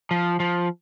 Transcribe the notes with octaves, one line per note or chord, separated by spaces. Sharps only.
F3
F3